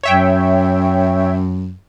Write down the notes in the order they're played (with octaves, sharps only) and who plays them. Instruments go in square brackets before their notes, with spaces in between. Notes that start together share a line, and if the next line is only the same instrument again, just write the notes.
[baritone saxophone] F#2 [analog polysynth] C#5 E5 G5